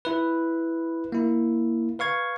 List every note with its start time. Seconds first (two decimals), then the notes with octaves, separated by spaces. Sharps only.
0.05 E4 B4
1.12 A#3 E4
1.99 B4 F5 C#6 G#6